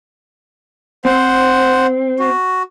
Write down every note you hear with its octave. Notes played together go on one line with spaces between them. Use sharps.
C4 C5 F#5
F#4